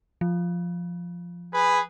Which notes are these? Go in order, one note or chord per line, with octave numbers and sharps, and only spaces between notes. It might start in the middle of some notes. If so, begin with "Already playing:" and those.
F3
G#4 B4